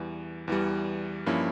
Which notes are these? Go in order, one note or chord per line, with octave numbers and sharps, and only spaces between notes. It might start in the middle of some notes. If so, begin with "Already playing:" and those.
Already playing: E2 E3 G3
E2 E3 G3
G2 F3 A#3 C#4 E4